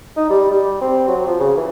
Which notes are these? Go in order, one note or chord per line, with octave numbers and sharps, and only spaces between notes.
D#4
G3
G3
C4
F#3
F3
C#3
E3